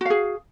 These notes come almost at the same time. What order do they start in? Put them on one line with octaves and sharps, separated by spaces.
F#4 F5 G#4